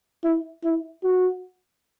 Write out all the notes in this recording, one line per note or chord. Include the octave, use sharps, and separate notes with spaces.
E4
E4
F#4